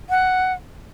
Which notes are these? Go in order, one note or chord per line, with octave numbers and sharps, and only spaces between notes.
F#5